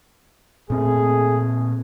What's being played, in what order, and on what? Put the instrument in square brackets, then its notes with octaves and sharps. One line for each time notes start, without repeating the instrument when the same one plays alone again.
[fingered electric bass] A#2 C4 [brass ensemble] A3 G#4